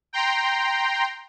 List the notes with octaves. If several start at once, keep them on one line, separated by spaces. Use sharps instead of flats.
G5 A#5 C6